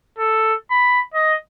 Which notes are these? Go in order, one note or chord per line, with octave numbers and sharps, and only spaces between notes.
A4
B5
D#5